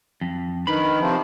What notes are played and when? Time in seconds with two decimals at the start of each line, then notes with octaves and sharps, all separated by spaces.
0.21 F2
0.67 D#3 D4 B4 B5
1.00 C3 F3